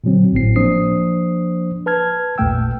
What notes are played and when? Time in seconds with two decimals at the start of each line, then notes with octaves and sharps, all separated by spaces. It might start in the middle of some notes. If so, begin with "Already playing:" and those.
0.04 A#2 D3 F#3 C4
0.33 G#1 A2 C4 C7
0.56 F3 A#3 D4 C5 D#6 C7
1.86 B4 A5 F6 G#6
2.38 A1 E2 A#2 A3 G5 E6